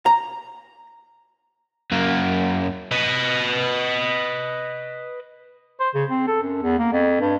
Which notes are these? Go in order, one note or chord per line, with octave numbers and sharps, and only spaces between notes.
A#5
F#2 A#3
B4 D#5
C5
C#3
C4
A4
F#2
E2
A#3
F2
G2